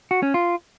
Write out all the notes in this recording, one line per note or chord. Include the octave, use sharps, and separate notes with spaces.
F#4
C#4
F4